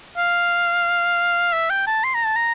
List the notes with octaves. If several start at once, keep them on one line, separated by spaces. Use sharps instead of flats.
F5
E5
G5
A5
C6
A#5
A5
A#5